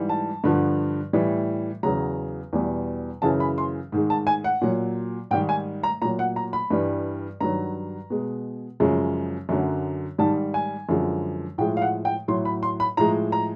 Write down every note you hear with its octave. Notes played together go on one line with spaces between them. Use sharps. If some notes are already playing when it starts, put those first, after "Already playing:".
Already playing: G#2 E3 G3
A5
G2 D3 F3
A2 E3 G3
E2 C#3 F#3 A#5
E2 B2 G3
F#2 C#3 E3 A5
B5
C6
G#2 D#3 G#3
A5
G#5
F#5
A#2 F#3
G#2 D#3 G3 G5
G#5
A#5
A#2 F#3 A#5
F#5
A#5
B5
G2 E3 G3
G2 D#3 F#3 A#5
B2 G#3
F#2 C#3 F3 G#3
F#2 D3 F#3
G#2 D#3 G3 A5
G#5
F#2 D3 F3 G#3
A2 F3 G#3 G5
F5
F#5
G5
A2 F#3 C6
B5
C6
B5
A2 F3 G#3 A#5
A#5